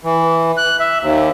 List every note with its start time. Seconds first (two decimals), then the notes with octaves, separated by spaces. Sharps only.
0.04 E3
0.57 F#6
0.80 E5
1.01 D#2